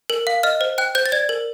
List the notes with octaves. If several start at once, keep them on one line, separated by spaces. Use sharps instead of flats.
A#4
F5
D#5 F6
C5
G5 F#6
C5 G6
A6
D5 G#6
A#4